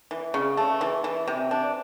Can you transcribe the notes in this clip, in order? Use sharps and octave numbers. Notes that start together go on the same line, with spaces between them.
E3
C#3
A3
E3
E3
C3
D4